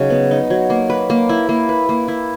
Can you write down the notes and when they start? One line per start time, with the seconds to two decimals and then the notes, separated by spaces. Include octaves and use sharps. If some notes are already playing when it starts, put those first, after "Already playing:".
Already playing: C#3 F#3 D#4
0.10 B3
0.31 D#4
0.50 F#3
0.70 A#3
0.90 B4
1.10 A#3
1.29 E4
1.49 A#3
1.69 B4
1.89 A#3
2.08 E4